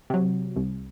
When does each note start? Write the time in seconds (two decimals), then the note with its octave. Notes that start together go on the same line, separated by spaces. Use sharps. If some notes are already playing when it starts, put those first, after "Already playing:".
0.10 C3 F#3
0.56 C2